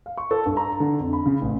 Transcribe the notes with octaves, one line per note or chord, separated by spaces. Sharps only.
F5
C#6
A4
G2
A#5
D3
F2
B5
C#3
A1